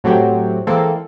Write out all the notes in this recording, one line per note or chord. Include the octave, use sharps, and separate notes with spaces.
A2 F#3 A3 C4 F#4 G4
E3 G#3 A#3 C4 A4